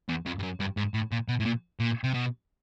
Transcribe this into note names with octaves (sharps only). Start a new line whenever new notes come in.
E2
F2
G2
F#2
G2
G#2
A2
A#2
B2
A2
A#2
A#2
C3
B2